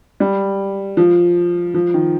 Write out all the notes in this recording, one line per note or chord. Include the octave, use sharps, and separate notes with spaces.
G3
F3
F3
D#3